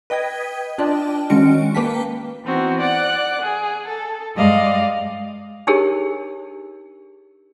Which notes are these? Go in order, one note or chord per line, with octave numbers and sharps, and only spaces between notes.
B4 D#5 G5 D#6 G#6
D4 F4 D5 D#5 G5 A5
D#3 G#3 C#4 F#4 C#7 D7
A#3 B4 G5 A5 B6
E3 B3 C4 D#4 F#4
D5 F#5 F#6
G#4
A4
G2 G#3 D5 D#5 F5
D4 D#4 G4 G#4 A#4 C#5